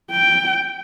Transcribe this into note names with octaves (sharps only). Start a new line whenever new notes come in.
G5